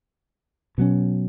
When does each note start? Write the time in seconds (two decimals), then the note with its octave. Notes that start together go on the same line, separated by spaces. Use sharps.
0.78 B2 F#3 C#4